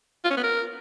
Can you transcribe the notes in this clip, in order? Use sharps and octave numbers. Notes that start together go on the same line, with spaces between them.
F4
C#4
B3
A#4